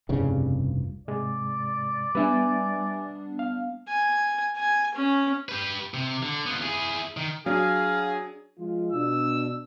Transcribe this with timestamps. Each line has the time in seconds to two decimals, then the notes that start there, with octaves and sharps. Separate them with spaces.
0.09 F1 C2 G2 C#3
1.08 G#2 C3 G#3 D5
2.15 G3 B3 D4 B4 E5 G#5
3.39 F5
3.88 G#5
4.57 G#5
4.94 C#4
5.49 G4 B4
5.94 C3
6.23 D3
6.46 B3 F4
6.62 E4 G#4
7.17 D#3
7.46 F#3 D4 G#4 F5
8.58 F3 G#3 F4
8.93 B2 D4 E6